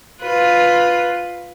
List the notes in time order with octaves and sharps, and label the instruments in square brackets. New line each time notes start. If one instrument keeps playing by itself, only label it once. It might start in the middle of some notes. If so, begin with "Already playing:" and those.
[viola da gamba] F4 B4